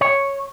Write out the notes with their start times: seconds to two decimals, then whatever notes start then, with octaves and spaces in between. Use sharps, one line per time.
0.01 C#5